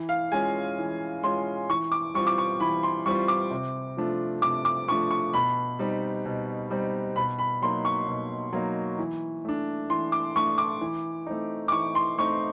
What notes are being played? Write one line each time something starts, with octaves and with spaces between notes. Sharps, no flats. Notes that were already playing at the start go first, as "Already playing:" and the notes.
Already playing: E3
F5
G#3 C#4 F4 G#5
E3
G#3 C#4 F4 C6
E3 C#6
D6
G3 C4 F4 C#6
D6
C#6
E3 B5
C6
G3 C4 F4 C#6
D6
C3
F3 A3 D4 F4
C3 D6
D6
F3 A3 D4 F4 C#6
C#6
B2 B5
G3 C4 D#4
B2
G3 C4 D#4
B2 B5
B5
F#3 A#3 D#4 C6
C#6
B2
F#3 A#3 D#4
E3
A3 D4
E3 C6
D6
A3 D4 C#6
D6
E3
A3 C4 D#4
D6
E3 C#6
C6
A3 C4 D#4 C#6